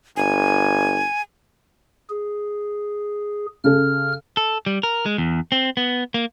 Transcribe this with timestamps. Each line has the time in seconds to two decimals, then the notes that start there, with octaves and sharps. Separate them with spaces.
0.17 G1 G#5
2.10 G#4
3.64 C#3 A4 F6
4.37 A4
4.66 G3
4.83 A#4
5.06 G#3
5.18 E2
5.52 C4
5.77 B3
6.14 A#3